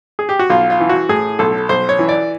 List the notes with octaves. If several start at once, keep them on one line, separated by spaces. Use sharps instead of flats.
G#4
G4
F#4
B1 F4
F4
E3
F#4
A2 G#4
B1 A4
B1 C5
C#5
E3
D5